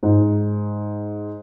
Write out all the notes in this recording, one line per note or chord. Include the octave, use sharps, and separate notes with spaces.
G#2